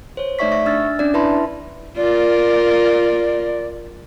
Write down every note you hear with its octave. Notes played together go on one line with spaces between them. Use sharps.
C5 C#5
A3 D#4 D5 E5 C#6 B6
E5 C#6 A#6
D4 E6 F6 A6
C#4 D4 D5
E4 B4 E5 A5 B5 C6
F4 A#4 D5